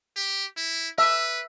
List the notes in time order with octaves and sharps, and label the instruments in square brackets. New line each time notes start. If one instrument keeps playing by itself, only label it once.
[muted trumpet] G4
E4
[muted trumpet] B4 [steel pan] E5